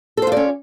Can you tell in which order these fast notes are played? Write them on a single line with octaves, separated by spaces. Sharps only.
A4 C5 F4 D5 C#4